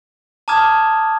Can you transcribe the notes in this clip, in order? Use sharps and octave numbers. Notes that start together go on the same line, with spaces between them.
A5 A#5 D6 D#6 F6 G#6